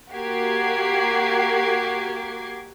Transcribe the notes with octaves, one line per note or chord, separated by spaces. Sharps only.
A#3 F#4 G4 D6 G#6 C7